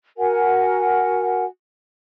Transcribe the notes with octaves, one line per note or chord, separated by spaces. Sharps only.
F#4 A#4 F#5 G#5